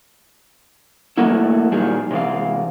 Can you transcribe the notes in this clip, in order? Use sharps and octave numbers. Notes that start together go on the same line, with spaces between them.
D#3 F3 F#3 A3 A#3 E4
A#2 D#3 F#3 G3 G#4
C3 E3 G#3 F5